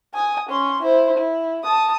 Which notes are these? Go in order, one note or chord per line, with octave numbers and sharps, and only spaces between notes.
G#5 D#6
C#4 C6
E4 C5
E4
A5 D#6